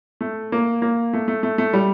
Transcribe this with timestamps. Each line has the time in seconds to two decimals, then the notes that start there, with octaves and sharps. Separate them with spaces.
0.21 A3
0.52 A#3
0.82 A#3
1.13 A3
1.28 A3
1.43 A3
1.58 A3
1.73 G3